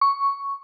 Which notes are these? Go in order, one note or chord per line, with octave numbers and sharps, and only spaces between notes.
C#6